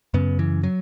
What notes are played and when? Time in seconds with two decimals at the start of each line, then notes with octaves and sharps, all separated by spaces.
0.14 F#2 C#3 B3
0.39 E3
0.63 F#3